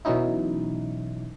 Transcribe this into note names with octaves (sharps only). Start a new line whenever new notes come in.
B2 E3 F#3 C#4 D#4 E4